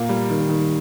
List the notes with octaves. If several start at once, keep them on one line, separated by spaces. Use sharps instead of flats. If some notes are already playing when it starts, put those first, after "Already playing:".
Already playing: A#2 A#3
G3
D#3
D#3